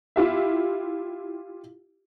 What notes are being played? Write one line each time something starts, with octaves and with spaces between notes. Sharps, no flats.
E4 F4 G4 E5